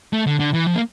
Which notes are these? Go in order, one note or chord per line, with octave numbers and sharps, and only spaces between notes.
A3
D3
D3
E3
F3
A#3